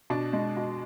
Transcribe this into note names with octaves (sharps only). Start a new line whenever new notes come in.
B2 D4
G#3
B2